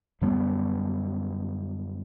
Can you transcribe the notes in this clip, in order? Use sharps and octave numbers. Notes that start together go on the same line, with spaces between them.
F#2 D3 G3 B3